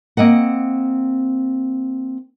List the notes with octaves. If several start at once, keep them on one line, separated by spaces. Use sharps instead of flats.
A#3 C4 D#5 F#5